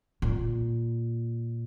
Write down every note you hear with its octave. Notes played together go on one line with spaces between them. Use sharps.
A#2